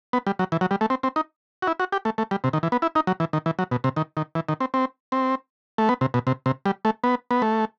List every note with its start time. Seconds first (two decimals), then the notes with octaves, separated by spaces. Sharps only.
0.13 B3
0.27 G3
0.39 F#3
0.52 E3
0.61 F#3
0.71 G3
0.81 A3
0.90 C4
1.03 C4
1.16 D#4
1.62 F#4
1.67 E4
1.80 F#4
1.92 G4
2.05 A3
2.18 A3
2.31 G3
2.44 C3
2.53 D#3
2.63 E3
2.72 B3
2.82 E4
2.95 D#4
3.07 F#3
3.20 E3
3.33 D#3
3.46 E3
3.59 F#3
3.71 B2
3.84 C3
3.96 D#3
4.17 D#3
4.35 E3
4.49 D#3
4.61 C4
4.74 C4
5.12 C4
5.78 A3
5.89 B3
6.01 C3
6.14 B2
6.27 C3
6.46 C3
6.66 G3
6.85 A3
7.04 B3
7.31 B3
7.42 A3